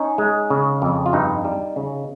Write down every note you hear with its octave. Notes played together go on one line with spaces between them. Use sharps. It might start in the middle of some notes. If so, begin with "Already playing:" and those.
Already playing: C#4 D#4
G#3
C#3
F2
F4
G2 D#4
G3
C#3